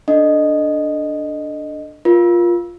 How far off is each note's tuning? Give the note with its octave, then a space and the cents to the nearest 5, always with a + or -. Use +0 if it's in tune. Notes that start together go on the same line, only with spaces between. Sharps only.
D4 +0 A4 +0 D#5 -10
F4 +0 A#4 +35